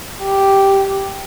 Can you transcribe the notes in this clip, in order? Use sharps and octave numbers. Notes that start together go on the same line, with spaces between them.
G4